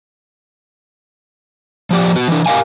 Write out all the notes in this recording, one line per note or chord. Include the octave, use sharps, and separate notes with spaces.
F3 G4 D5
B3 F#4
E3 D4
G4 A#4 D#5 F5 G#5